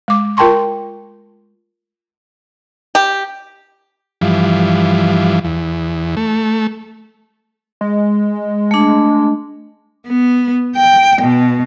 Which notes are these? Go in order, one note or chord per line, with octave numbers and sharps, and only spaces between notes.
G#3 D6
F4 A#4 G5 A5 C6 C#6
G4
G2 E3 F3
E2
A3
G#3
A3 D4
B3
G5
B2